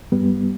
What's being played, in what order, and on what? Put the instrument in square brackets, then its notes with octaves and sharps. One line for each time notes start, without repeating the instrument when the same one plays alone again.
[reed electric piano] G2 G3 B3